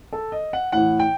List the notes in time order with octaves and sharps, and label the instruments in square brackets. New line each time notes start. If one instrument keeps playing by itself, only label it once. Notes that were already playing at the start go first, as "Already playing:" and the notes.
[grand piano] A4
D#5
F#5
A2 E3 F#5
G5